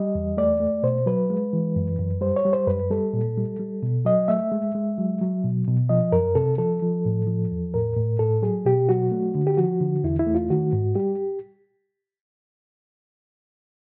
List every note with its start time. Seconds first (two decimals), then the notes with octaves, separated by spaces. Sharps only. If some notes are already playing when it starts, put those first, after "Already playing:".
Already playing: G3 D#5
0.15 E2
0.37 A3 D5
0.60 A3
0.83 B2 C5
1.06 F#3 B4
1.30 G#3
1.53 E3
1.76 F#2
1.99 F#2
2.21 G3 C5
2.36 C#5
2.45 G3
2.53 C5
2.67 F#2 B4
2.90 G3 A4
3.13 A#2
3.37 G3
3.59 G3
3.83 B2
4.05 F#3 D#5
4.28 A3 E5
4.52 G#3
4.75 G#3
4.98 F#3
5.21 F#3
5.44 B2
5.67 B2
5.89 F3 D#5
6.12 F#2 A#4
6.35 C3 A4
6.58 F3 A4
6.82 F3
7.05 A2
7.27 F3
7.51 E2
7.74 A2 A#4
7.96 A2
8.19 A2 A4
8.42 F#3 G#4
8.65 B2 G4
8.89 F#3 F#4
9.11 A3
9.35 D3
9.47 G4
9.57 F3 F#4
9.81 D3
10.04 E2 E4
10.19 E4
10.27 A3
10.35 F4
10.50 D#3 F#4
10.73 G#2
10.95 G3 G4